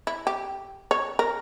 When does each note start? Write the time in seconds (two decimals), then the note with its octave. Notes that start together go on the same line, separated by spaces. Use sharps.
0.07 E4
0.27 G4
0.91 C#5
1.19 A#4